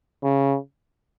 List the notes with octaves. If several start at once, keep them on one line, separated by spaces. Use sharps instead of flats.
C#3